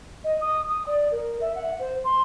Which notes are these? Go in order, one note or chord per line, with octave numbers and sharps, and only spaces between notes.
D#5
D#6
D#6
D5
A#4
E5
F#5
C5
C6